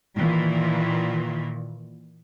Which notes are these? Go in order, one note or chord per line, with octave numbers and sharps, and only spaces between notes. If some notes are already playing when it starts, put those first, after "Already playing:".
A#2 D#3 E3